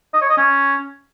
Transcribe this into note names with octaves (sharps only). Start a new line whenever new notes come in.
D#5
C#5
D#5
C#4